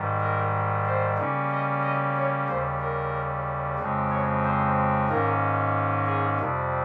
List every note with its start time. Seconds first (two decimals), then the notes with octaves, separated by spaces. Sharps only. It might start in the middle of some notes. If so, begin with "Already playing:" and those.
Already playing: G#2 D#3 G3
0.20 A#4
0.86 C5
1.18 C#3 G3 A#3 C#4
1.51 D#5
1.83 D#5
2.16 C#5
2.49 D#2 C#3 G3 C5
2.81 A#4
3.79 F2 C#3 G#3 C4
4.11 C#5
4.44 C5
5.09 G#2 D#3 A#3 C#4 A#4
6.06 G#4
6.39 F2 C3 G3